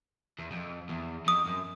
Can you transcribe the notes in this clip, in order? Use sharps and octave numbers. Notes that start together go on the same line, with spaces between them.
E2
F2
E2
F2 D#6
F#2